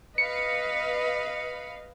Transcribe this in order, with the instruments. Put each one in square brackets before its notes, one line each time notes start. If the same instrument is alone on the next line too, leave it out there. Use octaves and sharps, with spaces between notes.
[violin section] B4 F5 [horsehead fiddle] D#5 [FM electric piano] C#7